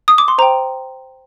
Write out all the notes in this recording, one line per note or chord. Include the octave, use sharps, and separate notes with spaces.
D#6
D6
C6
C5 G5 A#5